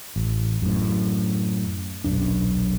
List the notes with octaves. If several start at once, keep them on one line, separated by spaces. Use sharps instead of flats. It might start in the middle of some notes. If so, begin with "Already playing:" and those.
A1
F#2 A2
D#1 B1 F#2 D4